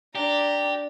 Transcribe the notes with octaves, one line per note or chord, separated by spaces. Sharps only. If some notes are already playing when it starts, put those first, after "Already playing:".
D4 G4 A#5